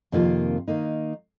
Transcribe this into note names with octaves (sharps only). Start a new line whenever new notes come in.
F2 C3 D#3 A#3 F4
D#3 A#3 D#4